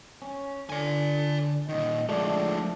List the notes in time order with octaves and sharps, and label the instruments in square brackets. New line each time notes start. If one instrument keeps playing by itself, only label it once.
[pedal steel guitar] C#4
[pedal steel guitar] D3 [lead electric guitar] D5 G#5
[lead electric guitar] A#2 D#3 [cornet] D#5
[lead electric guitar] F3 G#3 [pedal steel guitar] A3 D4 [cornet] D5